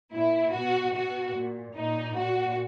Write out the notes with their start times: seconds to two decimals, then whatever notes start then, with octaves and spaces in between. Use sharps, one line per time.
0.12 A#2 E4
0.53 B2 F#4
0.94 B2 F#4
1.36 A#2
1.76 A#2 D#4
2.17 A#2 F#4